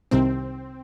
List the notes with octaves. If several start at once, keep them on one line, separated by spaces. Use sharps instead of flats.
C2 C3 D#3 C4